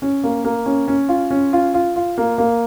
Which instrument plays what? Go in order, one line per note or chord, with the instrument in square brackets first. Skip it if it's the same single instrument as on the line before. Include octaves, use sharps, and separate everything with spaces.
[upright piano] C#4
A#3
A#3
C#4
C#4
F4
C#4
F4
F4
F4
A#3
A#3